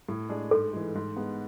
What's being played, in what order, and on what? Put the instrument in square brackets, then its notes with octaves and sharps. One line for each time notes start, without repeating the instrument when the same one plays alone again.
[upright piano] A2
G#3 D4 G#4
[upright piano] G#2 [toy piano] A4
[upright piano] E3 G#3
G#2
G#3 B3